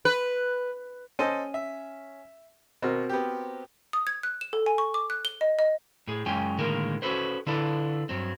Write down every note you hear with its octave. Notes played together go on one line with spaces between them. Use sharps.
B4
C#4 A4 C5 D#5 D#7
E5
B2 C4 F#4 A#4
B3 G4
D#6
G#6
F#6
E7
A4
G#5
C#6
D6
F#6
G7
D#5
D#5
A2 G#4
F#2 G#3 C#4 F4 G5 G#5
A2 D3 D#3 G#3 A#3 A#4
C#4 F#4 G#4 A4 B4 C5
D3 D4 E4 F4 A4 B4
G2 F#3 C4